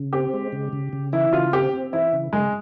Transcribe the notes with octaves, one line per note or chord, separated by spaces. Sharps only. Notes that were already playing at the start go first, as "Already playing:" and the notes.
Already playing: C#3
C4 G4
G#3
C#3
C#3
C#3
E3 E4
C#3 F4
C4 G4
C4
E3 E4
C#3
C#3 G#3